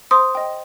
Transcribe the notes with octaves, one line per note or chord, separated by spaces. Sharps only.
C5 C6 D#6
D#5 G5